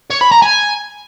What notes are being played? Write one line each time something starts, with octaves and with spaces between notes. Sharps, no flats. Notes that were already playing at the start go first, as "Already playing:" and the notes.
C#5
B5
A#5
G#5